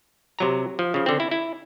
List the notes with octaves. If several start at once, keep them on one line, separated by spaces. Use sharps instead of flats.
C3 F#3 A#5
F3
C#3 F3
D3 C4
E4
E4